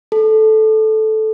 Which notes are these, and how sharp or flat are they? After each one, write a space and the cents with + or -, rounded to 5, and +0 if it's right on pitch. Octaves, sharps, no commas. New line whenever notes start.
A4 -10